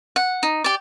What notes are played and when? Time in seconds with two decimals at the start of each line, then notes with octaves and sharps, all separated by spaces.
0.16 F#5
0.43 D#4
0.64 G4 D5